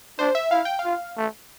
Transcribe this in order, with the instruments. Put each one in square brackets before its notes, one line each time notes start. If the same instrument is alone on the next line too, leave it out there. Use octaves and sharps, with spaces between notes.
[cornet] D4 [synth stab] C5
[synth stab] E5
[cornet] E4 [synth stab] F5
[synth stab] G5
F5
[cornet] F4
A3